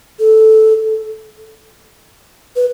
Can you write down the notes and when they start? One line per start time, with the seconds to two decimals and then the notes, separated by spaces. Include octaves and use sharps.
0.20 A4
2.56 B4